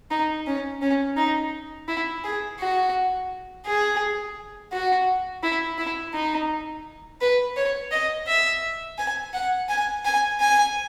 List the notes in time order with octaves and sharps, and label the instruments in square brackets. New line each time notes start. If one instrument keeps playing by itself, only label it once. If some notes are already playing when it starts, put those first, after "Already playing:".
[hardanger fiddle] D#4
C#4
C#4
D#4
E4
G#4
F#4
G#4
F#4
E4
E4
D#4
B4
C#5
D#5
E5
G#5
F#5
G#5
G#5
G#5